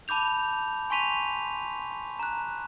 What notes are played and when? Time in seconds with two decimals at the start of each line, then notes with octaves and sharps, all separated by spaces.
0.08 A5 B5 D6 G6 F7
0.90 G#5 C6 C#6 B6 D#7 F7
2.19 A#5 F#6